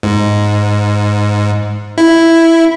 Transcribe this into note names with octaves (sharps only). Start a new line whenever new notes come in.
G#2
E4